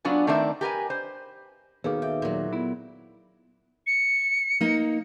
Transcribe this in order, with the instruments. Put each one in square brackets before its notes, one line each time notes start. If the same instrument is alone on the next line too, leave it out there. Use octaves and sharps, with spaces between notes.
[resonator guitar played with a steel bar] F#3 B3 D4 F4 G#5
D#3 A3 C4 A#4 D5 E5
G4 A#4 B4 G#5
C5
[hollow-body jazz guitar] D#2 B2 D#3 [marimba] G#4 [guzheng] A4 [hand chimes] B4 F5 D6
[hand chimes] D#4 E5 D6 [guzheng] G5
[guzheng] A#2 F#3
[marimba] B3 [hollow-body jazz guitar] E4
[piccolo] C#7
[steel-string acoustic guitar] A#3 D#4